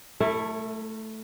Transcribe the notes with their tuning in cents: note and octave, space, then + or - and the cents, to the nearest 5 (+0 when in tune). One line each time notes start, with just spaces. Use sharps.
A3 +0 E4 +0 A#4 -45